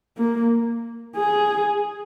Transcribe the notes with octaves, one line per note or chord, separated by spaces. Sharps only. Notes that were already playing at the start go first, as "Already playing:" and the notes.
A#3
G#4